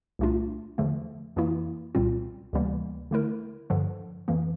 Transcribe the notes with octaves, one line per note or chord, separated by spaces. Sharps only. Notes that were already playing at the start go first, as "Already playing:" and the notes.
C2 A#2 A3 D4 F4
E2 D3 F3 A3
F2 E3 A#3 E4
C2 A#2 G3 C4 F4
D2 C3 E3 G3 A#3
D3 A3 E4 A#4
G2 D3 F3
F2 E3 A#3